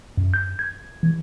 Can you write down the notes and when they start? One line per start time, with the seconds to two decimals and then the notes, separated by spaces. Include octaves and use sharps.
0.17 F#2
0.34 G6
0.59 G#6
1.03 E3